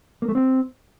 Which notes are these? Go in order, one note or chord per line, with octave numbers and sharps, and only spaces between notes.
A#3
A3
C4